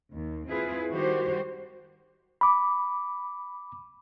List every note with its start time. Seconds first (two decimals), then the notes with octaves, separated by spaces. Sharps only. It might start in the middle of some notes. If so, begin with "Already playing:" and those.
0.11 D#2
0.49 C4 E4 F4 G#4 B4
0.89 D#3 G3 F#4 G4 C5
2.41 B5 D6